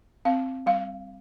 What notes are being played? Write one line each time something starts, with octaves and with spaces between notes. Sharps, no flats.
C4 F5
G3 F5